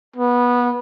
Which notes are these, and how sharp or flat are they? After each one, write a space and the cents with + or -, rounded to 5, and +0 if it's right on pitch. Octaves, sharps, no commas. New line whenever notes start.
B3 -20